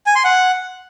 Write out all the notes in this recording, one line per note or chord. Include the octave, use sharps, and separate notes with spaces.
G#5
C6
F#5